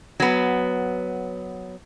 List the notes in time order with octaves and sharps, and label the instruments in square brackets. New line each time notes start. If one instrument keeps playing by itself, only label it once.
[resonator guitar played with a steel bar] F#3 B3